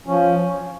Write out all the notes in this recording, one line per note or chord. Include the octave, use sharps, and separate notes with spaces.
F3 C#4